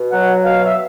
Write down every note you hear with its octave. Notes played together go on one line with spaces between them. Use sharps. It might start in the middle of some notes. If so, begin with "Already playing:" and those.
Already playing: B2
F#3 F#5
B2 F5
E5